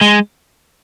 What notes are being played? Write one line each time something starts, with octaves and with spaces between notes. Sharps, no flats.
G#3